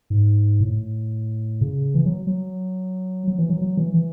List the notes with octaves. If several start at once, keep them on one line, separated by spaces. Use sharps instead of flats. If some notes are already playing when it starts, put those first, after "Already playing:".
G#2
A2
C#3
E3
F#3
F#3
F#3
E3
F#3
F#3
E3
E3